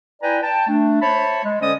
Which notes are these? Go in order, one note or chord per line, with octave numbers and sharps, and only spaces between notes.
E4 B4 D5 G5 G#5 A#5
G5 A5
A3 D4
C5 C#5 E5 A5 B5
G#3
D3 C#4 C5 D5 D#5 D#6